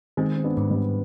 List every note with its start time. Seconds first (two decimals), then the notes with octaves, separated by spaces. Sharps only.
0.17 D#3 G#3 C4
0.36 C4
0.44 B3 D4
0.57 G#2
0.70 G3 B3